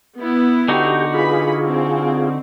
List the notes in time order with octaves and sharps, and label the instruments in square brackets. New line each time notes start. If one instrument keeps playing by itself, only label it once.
[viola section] B3 E4
[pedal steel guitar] D3 D#4 F#4 [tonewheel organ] G4 G5
[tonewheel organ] F4 G#4 [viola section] B4 B5
[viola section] C4